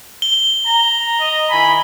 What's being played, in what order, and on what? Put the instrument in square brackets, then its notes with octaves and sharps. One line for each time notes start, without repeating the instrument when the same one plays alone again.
[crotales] G7
[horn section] A#5
[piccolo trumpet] D#5
[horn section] D#3 E4 G#5 [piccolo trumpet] B5